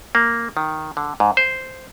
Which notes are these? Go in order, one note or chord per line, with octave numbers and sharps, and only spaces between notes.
A#3
D#3
D3
G#2
C5